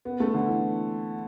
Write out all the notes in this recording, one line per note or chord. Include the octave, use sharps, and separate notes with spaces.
B3
A3
D3
E3